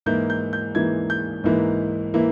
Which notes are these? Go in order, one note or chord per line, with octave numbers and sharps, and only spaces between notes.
G#2 E3 A#3 E4 G6
G6
G6
G#2 E3 A#3 E4 G#6
G6
G#2 E3 A#3 E4
E3 A#3 E4